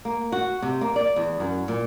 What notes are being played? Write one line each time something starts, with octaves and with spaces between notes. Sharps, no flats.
A#3
F#4
C3
A#3
D5
E2
F#2
A#2